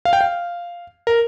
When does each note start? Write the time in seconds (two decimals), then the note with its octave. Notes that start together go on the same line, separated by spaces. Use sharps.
0.05 F5
0.13 G5
0.21 F5
1.07 A#4